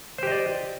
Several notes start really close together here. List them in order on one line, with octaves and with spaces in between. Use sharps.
C5 G4 D#5 D5